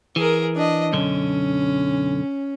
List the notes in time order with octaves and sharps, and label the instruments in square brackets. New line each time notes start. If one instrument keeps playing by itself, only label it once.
[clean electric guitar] E3 [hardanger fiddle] G#4 A#4
[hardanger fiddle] D4 D#5
[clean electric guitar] B1 F#2 D3 [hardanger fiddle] C#4